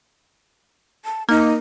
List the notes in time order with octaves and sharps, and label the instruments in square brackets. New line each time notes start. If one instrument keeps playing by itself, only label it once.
[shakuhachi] A5
[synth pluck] A#3 [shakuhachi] D#4